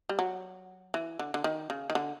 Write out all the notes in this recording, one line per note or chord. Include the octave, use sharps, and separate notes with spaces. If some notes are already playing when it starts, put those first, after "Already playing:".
G3
F#3
E3
D3
D3
D#3
C#3
D#3
D3